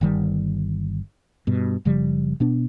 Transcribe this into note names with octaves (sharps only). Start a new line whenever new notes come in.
G1 D#3 G3
G2 B2
F#1 C#3 F3 G3
B2 B3 D4